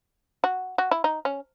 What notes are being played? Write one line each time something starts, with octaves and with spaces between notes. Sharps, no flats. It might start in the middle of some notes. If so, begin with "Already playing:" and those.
F#4
F#4
E4
D#4
C#4